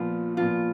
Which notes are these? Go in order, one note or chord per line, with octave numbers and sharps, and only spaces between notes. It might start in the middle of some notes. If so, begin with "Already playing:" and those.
Already playing: A#2 F3 B3 F4
A#2 F3 B3 F4